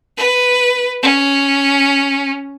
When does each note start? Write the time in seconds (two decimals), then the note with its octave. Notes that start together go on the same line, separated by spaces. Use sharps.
0.17 B4
1.03 C#4